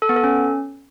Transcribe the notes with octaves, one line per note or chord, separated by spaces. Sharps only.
A4
B3
A4
C#4